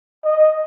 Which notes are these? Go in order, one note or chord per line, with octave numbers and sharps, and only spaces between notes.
D#5